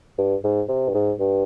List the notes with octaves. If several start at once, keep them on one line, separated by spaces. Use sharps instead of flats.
G2
G#2
C3
G2
G#2
G2